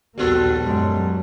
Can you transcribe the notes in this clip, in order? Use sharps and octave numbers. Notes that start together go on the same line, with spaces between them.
A#1 D#2 G3 A#3 B3 F#4 A4
F#2 F#3 G#3